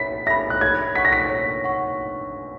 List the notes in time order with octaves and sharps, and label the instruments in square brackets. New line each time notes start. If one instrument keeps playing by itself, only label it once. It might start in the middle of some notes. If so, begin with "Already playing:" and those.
Already playing: [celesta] C#5 E5 B5 [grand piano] B6
[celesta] E5 B5 [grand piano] A#6
[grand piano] F#6
[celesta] C#5 [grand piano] G#6
[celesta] F#5 C#6 [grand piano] B6
[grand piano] A#6
B6
[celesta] C#5
F#5 C#6